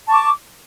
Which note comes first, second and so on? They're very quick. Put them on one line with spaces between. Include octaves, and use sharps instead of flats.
A5 C#6 D6